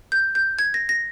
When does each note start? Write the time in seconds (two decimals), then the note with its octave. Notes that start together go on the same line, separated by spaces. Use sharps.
0.12 G6
0.35 G6
0.59 G#6
0.74 A#6
0.89 A#6